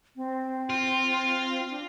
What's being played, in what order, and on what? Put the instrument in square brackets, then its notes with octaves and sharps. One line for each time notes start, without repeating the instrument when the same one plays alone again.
[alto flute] C4
[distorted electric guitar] F4
[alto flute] D4